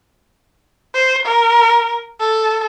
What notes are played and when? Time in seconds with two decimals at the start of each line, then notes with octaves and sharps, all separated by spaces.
0.94 C5
1.25 A#4
2.20 A4